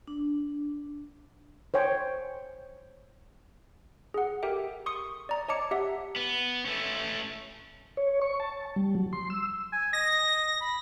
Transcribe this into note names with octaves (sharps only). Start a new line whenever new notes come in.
D4
C5 C#5 G5 G#5
G#4 F#5
G4 A4 A#4 E5 G5
C6 C#6 D#6 C#7
D5 A#5
C#5 D#5 A5 A#5 D6 C#7
G4 E5 F#5
B3
A3 C#4
C#5
C#6
A5
G3
F#3
C6
E6
G#5
D#5 A#6
B5